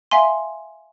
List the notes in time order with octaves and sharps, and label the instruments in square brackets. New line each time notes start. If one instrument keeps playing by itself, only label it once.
[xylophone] E5 F5 G#5 C6